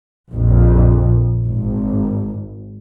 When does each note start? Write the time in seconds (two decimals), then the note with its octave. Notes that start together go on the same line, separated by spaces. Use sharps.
0.32 A#1 F2
1.45 G#1